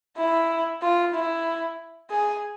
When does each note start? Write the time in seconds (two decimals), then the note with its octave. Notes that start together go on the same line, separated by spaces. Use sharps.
0.17 E4
0.82 F4
1.14 E4
2.10 G#4